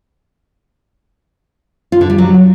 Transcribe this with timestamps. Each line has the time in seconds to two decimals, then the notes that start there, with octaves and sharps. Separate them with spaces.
1.92 F4
2.01 D3
2.10 G3
2.18 F#3